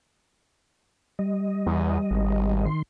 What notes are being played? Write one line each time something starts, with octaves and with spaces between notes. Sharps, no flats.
G3 D#5
E2
G#1
D#3 C6